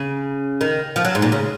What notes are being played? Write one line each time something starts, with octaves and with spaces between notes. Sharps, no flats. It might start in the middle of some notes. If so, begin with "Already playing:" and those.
Already playing: C#3
D#3
F3
F#3
G#2
A#2
C#3